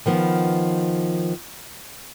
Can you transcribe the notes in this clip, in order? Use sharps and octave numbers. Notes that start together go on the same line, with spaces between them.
D#3 F3 B3